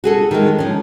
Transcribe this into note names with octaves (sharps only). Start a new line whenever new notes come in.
F#4 G#4 A4
D#3 G#3
F3 C#4